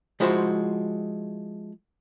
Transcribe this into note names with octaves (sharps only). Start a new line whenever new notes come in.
F3 G#3 E4 F#4 C5